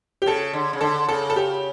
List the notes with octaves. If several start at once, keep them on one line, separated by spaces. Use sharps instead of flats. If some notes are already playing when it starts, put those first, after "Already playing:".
G4
C#3 A4
D3
C#3
D3 A4
C#3 A4
A4
G4